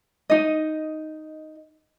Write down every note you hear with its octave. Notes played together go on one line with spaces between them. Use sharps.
D#4 D#5